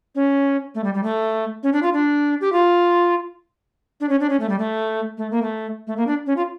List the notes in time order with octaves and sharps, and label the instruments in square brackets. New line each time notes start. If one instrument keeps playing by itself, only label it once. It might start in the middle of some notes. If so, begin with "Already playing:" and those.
[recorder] C#4
A3
G3
G3
A3
C#4
D4
F4
D4
G4
F4
D4
C#4
D4
C#4
A3
G3
A3
A3
A#3
A3
A3
A#3
D4
C#4
F4